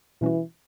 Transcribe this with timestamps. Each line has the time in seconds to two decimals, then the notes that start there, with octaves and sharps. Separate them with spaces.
0.21 B2 E3 G3 C#4 F#4